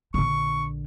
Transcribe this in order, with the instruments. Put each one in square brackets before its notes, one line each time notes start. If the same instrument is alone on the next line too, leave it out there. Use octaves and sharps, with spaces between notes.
[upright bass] A#1 D3 [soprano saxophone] C#6